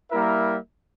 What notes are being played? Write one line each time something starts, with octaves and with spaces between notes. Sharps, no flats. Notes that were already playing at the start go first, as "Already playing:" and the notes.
G3 A#3 E4 A#4 E5